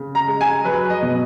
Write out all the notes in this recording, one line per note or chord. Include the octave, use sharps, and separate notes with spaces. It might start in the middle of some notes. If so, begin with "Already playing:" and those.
Already playing: C#3
A#5
G#3
G#5
F#3 B4
D#5
B2